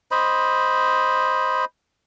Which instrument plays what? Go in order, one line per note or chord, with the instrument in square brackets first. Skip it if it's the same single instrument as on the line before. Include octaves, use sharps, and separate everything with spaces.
[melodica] C5 D#5 B5